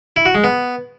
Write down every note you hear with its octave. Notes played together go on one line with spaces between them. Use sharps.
E4
F#4
G#3
B3